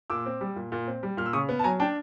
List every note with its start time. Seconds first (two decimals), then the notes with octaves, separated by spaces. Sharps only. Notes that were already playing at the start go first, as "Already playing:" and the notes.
0.10 A#2 D6 E6
0.26 C4
0.41 G3
0.56 A#2
0.72 A#2
0.87 C4
1.03 G3
1.17 A#2 F6
1.26 E6
1.33 C#3 C#6 D#6
1.49 B3
1.59 A5
1.64 F#3 G#5 A#5
1.80 D4 G5 A5